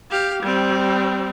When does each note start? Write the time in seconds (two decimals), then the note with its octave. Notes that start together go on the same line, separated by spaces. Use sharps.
0.10 G4 F5
0.43 G3 C4